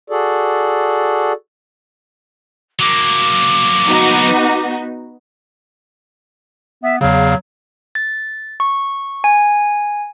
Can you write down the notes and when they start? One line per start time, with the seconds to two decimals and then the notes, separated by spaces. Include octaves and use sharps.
0.10 F#4 G#4 A4 D5
2.80 F#3 A#3 D6
3.87 B3 D#4 F#4
6.83 B3 E5
7.01 E2 C#3 F#3 F5
7.95 A6
8.60 C#6
9.24 G#5